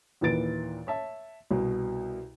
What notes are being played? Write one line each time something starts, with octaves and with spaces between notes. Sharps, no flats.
D#2 A#2 E3 B4 A6 D7
C#5 E5 A5
C2 B2